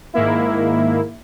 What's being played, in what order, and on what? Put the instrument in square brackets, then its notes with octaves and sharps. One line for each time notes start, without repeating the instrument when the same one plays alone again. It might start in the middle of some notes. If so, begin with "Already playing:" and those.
[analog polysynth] G#2 D#3 A#3 E4